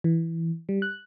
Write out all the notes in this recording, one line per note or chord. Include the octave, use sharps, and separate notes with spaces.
E3
G3
F#6